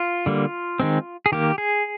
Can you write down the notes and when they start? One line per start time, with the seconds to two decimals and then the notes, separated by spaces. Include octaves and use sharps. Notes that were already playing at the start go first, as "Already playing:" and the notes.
Already playing: F4
0.26 D3 G3 A#3
0.80 D#3 G#3 C4
1.26 G#4
1.32 D#3 A#3 G4
1.58 G#4